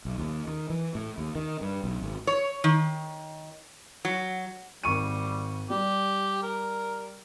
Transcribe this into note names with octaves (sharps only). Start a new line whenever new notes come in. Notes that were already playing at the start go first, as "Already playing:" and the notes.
B1
D#2
D#3
E3
A2
D#2
D#3
G2
B1
G#1
C#5
D#3
F#3
G#1 G3 C#6 D#7
G3 G4
A#4